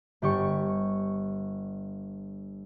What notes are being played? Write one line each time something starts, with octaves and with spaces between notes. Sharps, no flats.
G1 G4 C#6